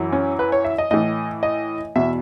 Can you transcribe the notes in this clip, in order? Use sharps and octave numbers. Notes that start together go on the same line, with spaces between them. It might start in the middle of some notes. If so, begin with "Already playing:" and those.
Already playing: F#2 E3
C#4
B4
C#5
E5
D#5
A2 E3 D#5
D#5
E2 B2 E5